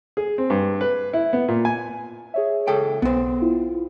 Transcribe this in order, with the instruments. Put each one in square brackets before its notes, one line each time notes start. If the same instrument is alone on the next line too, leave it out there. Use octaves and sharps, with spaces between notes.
[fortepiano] G#4
C4
G2
B4
E4
B3
A#2
G#5
[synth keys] G#4 C#5 E5
[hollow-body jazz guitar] C#2 A4 G5
[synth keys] B1 [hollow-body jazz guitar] B3 C5
[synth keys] E4 F4